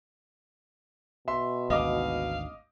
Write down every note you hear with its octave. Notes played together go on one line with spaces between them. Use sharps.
B2 E5 C6
G#1 D2 D#5 F5 D6